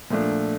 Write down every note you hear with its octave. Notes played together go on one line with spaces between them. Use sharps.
A#2 F3 A3 D4